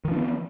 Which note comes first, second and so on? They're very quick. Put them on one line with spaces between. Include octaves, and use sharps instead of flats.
D#3 F3 D4 B3